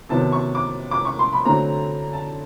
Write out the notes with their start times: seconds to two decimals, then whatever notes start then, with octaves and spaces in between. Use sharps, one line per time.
0.09 C3 D#3 F#3 B3 A5
0.32 C#6
0.55 D6
0.91 D6
1.05 C#6
1.19 C6
1.33 B5
1.45 D3 F#3 A3 C4 A#5
2.13 A5